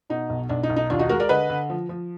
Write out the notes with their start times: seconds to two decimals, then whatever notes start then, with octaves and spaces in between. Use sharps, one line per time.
0.10 B2 D#4
0.30 B1
0.49 B1 D4
0.63 D#4
0.70 B1
0.76 D#4
0.90 D#2 D4 F4
0.99 D#4 F#4
1.09 G#3 F#4 A#4
1.20 A#4 D5
1.29 D3 B4 D#5
1.50 D3
1.70 F3
1.89 F3